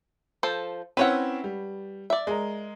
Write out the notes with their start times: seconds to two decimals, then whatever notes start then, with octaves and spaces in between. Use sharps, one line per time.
0.43 F3 A4 C5
0.97 C4 C#4 E4 B4 C#5 F#5
1.44 G3
2.10 D5 E5
2.27 G#3 A#4